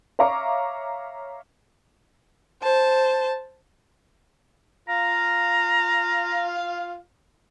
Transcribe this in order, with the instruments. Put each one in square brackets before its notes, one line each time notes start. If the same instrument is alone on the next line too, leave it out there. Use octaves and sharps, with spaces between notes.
[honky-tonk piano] C#5 E5 F5 A#5 C#6 D6
[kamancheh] C5 A5
[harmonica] F4 F5 [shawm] A#5